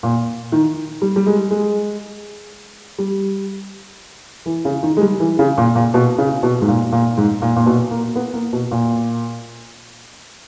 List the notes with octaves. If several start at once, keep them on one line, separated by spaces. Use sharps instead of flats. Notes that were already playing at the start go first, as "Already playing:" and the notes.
A#2
D#3
G3
G3
G#3
G#3
G3
E3
C#3
D#3
G#3
G3
E3
C#3
A#2
A#2
B2
C#3
B2
G#2
A#2
A#2
G#2
A#2
A#2
B2
A#3
B3
A#3
B2
A#2